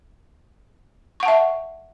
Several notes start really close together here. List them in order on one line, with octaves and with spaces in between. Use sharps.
C#6 F#5 A5 E5